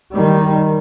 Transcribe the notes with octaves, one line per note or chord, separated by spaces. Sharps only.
D#3 G3